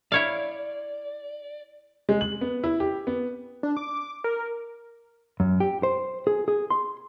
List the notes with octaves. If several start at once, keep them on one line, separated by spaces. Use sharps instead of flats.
E4 C#5 D5 F5
G#3
F#7
B3
E4
G4
B3
D4
D6
A#4
F#2
G4
C5
G#4
G#4
C6